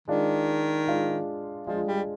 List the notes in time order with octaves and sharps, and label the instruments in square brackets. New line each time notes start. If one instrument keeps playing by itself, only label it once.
[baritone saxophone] D#3 [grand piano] G#3 D4 F4
[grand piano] G#3 D4 F4
[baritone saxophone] F3 [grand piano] G#3 D4 F4
[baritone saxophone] G3